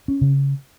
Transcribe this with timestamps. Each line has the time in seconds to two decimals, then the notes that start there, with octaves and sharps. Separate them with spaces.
0.08 C#4
0.21 C#3